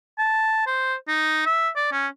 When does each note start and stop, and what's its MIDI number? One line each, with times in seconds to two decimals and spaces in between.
0.18 0.65 81
0.67 0.95 72
1.08 1.42 63
1.46 1.69 76
1.76 1.89 74
1.92 2.08 61